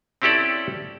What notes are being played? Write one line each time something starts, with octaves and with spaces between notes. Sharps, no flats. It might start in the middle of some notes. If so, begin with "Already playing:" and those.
C4 C#4 E4 G4 A4 D5